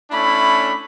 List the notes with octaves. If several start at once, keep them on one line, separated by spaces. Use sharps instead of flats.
A3 C#4 D4 E4 B5